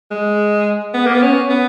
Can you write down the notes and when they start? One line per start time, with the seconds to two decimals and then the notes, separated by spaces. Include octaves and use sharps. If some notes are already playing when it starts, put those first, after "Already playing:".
0.11 G#3
0.94 B3
1.06 A#3
1.14 B3
1.22 C#4
1.50 B3